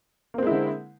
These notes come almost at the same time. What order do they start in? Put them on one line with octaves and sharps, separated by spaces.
A#3 C4 G#3 E4 D3